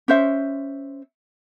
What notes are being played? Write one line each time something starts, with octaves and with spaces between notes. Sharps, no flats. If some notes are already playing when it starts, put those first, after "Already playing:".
C#4 C5 E5